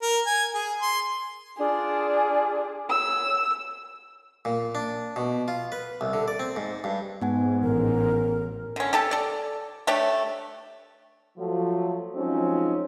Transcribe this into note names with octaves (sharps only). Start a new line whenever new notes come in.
A#4
G#5
G#4
C6
D4 F4 G#4
C#5 E6
A#2
D4
B2
F4
B4
C2
D3
D5
C4
G#2
G2
G#2 B3 F#5 G#5
A1 A#4
D3 C#4
G4 A4 A5
A4 D5
A3 D4 G4 C#5
F3 F#3 A3
F3 F#3 G#3 C4 C#4 D#4